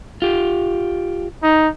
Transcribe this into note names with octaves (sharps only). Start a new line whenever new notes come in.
F4 G4
D#4